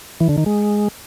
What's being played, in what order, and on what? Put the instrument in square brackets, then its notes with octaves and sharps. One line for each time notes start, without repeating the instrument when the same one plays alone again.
[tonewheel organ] E3
D3
D#3
G#3